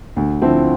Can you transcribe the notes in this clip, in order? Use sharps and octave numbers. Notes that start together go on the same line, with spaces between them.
D2
D3 F3 C4 E4